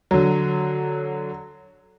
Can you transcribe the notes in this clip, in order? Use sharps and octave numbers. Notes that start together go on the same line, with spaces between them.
D3 F#3